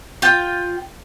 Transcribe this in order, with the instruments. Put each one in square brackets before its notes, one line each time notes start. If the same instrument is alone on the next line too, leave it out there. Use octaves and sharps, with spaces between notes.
[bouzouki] F4 G5